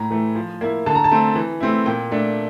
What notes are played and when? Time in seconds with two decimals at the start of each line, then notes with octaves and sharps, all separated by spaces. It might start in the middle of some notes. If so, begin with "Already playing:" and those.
Already playing: A2 A#5
0.11 E3 A3
0.35 F3
0.61 A#3 E4
0.86 D3 A5
0.95 A#5
1.04 A5
1.11 A3 C4
1.36 E3
1.60 A3 C4 E4
1.86 A#2 G5
2.11 A3 D4